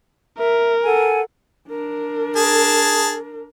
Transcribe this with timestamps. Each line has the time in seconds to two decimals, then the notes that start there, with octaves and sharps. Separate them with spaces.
0.38 A#4 E5
0.84 A4 F#5 G#5
1.69 D4 A#4
2.36 G#4 A5